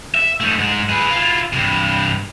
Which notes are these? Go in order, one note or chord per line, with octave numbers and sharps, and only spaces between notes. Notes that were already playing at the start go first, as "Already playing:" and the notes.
E5
A3 D#4
G#2 G#3
G#4 B4
E4 F4
G2 C3